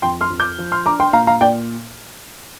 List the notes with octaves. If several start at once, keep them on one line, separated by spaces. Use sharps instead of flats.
F2 G5 C6
C6 F6
F2
D6 G6
F3
C6 F6
D4 A#5 D6
G5 C6
A#2 F5 A#5
F5 A#5
A#2 D5 G5